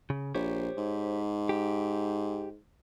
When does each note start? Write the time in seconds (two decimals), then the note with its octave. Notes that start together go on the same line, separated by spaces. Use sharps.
0.10 C#3
0.35 A#1 G4 C5 C#5
0.77 G#2
1.49 G4